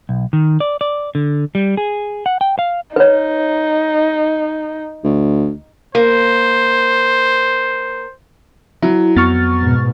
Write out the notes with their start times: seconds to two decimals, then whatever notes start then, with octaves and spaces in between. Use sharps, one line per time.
0.09 B1
0.33 D#3
0.60 D5
0.81 D5
1.15 D3
1.55 G3
1.77 G#4
2.26 F#5
2.41 G5
2.59 F5
2.96 D#4 B4 C#5
5.04 D2
5.95 A#3 C5
8.82 F#3 E4
9.16 F2 B3 C#6 F6 A6
9.61 G#2 B2